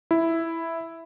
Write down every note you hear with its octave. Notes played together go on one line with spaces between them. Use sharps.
E4